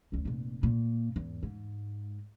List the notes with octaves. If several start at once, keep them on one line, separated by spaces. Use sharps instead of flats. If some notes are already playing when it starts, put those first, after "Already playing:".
F#1 D2
F1 A#2
A#2
E2 G#2
G#2